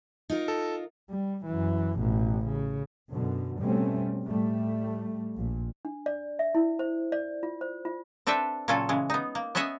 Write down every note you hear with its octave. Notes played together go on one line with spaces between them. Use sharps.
D#4 F4 A#4
A4
G3
F#2 E3
A1 B2
C#3
F#2 B2 D3
B2 G3 A3 C4 C#4
A2 G3 A3
A#1 A#2
D4
D5
E5
E4
C5
D5
F4
C5
F4
C4 D4 A4 B4 E5 G5
A#2 C#3 F#3 C#4 F4 A4
C#3 E3 G#3
B3 D#4
A#3
B3 C#4 D#5 E5 F#5 G#5